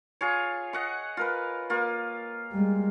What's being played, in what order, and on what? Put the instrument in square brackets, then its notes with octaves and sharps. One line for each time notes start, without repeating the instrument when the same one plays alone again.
[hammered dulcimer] F4 G#4 C#5
D#5 F#5 C#6
F4 A#4 B4
A#3 F4
[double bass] G3 G#3